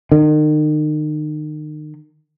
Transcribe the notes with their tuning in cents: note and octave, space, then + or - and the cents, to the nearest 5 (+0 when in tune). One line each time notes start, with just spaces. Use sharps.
D#3 -35